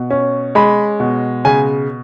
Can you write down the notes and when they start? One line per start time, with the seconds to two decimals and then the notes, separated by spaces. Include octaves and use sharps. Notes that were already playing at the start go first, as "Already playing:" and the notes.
Already playing: B2
0.10 C#4
0.55 G#3 B5
1.00 B2
1.45 C#3 G#5